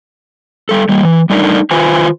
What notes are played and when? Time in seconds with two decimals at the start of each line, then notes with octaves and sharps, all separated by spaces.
0.69 G3 A4
0.89 G3 A#3
1.03 E3
1.30 G3 A3 D4 D#4 A#4
1.71 D#3 F4 B4 C5 G#5